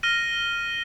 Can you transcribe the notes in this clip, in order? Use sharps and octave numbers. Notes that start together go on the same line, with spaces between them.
F6 A#6 D#7 G7